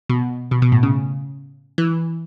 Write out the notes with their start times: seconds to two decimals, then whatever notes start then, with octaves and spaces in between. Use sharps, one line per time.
0.09 B2
0.51 B2
0.62 B2
0.72 A2
0.83 C#3
1.78 E3